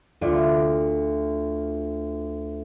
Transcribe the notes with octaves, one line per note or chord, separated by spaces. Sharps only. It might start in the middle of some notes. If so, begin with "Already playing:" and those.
D2 F4 D5